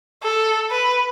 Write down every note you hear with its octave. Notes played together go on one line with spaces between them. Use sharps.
A4
B4